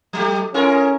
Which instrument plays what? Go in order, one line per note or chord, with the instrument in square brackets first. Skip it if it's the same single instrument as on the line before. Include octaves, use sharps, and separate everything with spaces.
[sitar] F#3 A3 G4
[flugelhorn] C#4 [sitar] E4 G#4 A#4